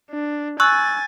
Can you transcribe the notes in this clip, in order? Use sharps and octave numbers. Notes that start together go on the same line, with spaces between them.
D4
G#5 C#6 E6 F#6 A6